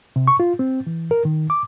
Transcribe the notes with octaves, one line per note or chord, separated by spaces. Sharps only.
C3
C#6
F4
C4
E3
A#4
D#3
D6